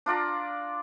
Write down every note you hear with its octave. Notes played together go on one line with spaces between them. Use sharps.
D4 F4 D5 A#5